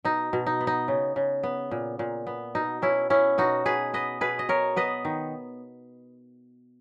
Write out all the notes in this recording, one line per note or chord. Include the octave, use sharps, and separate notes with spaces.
B2 D#4
B2
D#4
B3
D#4
C#3
C#3
B3
A#2
A#2
B3
B2 D#4
B2 C#4 E4
B3 C#4 E4
B2 D#4 F#4
B2 G#4 B4
B3 B4 D#5
B2 G#4 B4
D#5
B2 A#4 C#5
B3 B4 D#5
D#3